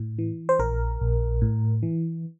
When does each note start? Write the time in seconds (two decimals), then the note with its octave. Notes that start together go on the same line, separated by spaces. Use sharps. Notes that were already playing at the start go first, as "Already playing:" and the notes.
Already playing: A2
0.19 E3
0.49 C5
0.59 A#1 A#4
1.01 A#1
1.42 A2
1.83 E3